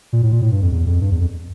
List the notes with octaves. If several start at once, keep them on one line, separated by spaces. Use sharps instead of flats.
A#2
A2
A#2
A2
G2
F2
E2
F2
G2
E2
F2